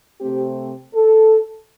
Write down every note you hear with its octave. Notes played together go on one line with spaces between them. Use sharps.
C3 A3 C4 G4
A4